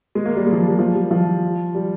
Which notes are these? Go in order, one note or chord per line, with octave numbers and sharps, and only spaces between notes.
G#3
A#3
G3
G#3
F3
G3
G3
F3
G3
F3
G3